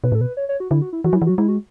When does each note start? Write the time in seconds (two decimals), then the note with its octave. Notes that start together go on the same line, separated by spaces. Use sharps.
0.04 B2 B4
0.12 A2 A4
0.21 B2 B4
0.37 C#5
0.49 C#5
0.60 F#4
0.70 D3 E4
0.82 F#4
0.93 E4
1.04 E3 F#4
1.13 F#3
1.16 E4
1.22 E3
1.26 F#3 F#4
1.38 G#3 E4
1.48 F#4